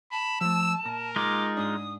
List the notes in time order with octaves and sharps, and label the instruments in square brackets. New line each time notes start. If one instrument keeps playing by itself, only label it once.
[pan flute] A5 [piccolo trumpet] B5
[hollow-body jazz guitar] F3 A3 [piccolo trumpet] E6
[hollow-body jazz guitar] A#2 A#5 [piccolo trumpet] A#4
[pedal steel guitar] G#3 D#4 F4 [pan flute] D6
[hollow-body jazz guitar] G#2 D4 [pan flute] D#6